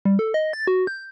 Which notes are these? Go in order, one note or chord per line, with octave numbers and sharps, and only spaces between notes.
G3
A4
D#5
A6
F#4
G6